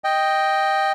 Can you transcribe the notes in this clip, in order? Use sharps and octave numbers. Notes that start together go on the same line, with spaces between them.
D#5 G5